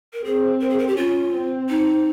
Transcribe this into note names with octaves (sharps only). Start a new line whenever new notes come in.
A#4
C4 G#4
A#4
G#4
A#4
G4
C#4 F4
C4
D#4